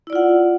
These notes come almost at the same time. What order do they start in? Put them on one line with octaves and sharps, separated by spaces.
E4 D5 F4 F#5